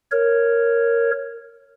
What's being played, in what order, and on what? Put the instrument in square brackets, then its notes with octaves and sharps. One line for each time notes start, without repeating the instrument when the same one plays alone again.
[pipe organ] A#4 C#5